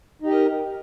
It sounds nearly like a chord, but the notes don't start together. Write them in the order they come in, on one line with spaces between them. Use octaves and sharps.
D#4 G4 D#5 A#4